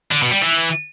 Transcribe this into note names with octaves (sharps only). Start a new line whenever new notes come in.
D3
B2
G3
E3